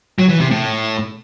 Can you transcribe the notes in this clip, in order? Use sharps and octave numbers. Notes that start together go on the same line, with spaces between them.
F#3
E3
C3
A2